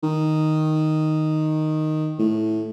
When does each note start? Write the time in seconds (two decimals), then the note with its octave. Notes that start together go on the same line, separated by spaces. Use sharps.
0.03 D#3
2.19 A2